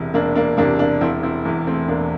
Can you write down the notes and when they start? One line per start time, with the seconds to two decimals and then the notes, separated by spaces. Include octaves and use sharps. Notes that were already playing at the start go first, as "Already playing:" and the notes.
Already playing: E1 E2 C3 E4
0.14 E1 A#3 D4
0.36 A#3 D4
0.57 E2 C3 A#3 D4
0.79 A#3 D4
1.01 E1 C4 E4
1.23 C4 E4
1.45 E2 E3
1.67 A3 C4
1.88 E1 A#3 D4